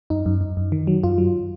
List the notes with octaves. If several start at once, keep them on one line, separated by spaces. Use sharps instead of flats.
F#2 D#4
F#2
F#2
F#2
D#3
F#3
F#2 F4
F#3